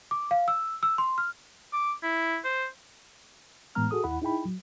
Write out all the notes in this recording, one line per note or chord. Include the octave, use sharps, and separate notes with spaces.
D6
F5
E6
E6
C6
F6
D6
E4
C5
A2 E3 G#3 B3 A#5 F6
F#4 G#4 A4 D#6
D#2 E4 F#5 B5
D#4 E4 G#4 G5 B5
F#3